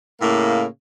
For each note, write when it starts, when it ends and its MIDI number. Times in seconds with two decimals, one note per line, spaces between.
0.21 0.65 45
0.21 0.65 49
0.21 0.65 58